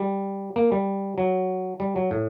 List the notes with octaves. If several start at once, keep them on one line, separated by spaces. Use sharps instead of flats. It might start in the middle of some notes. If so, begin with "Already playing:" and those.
Already playing: G3
A#3
G3
F#3
G3
F#3
A2